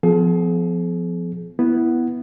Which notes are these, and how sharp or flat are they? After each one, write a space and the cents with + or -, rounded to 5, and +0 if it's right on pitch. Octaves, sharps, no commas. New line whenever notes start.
F3 +0 B3 +35 G#4 +40
B3 +0 E4 +5